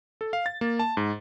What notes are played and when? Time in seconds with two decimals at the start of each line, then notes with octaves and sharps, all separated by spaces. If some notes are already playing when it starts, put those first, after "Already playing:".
0.21 A4
0.33 F5
0.46 A6
0.61 A#3
0.79 A5
0.97 G#2